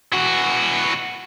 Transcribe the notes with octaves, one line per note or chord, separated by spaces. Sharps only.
E3 F#4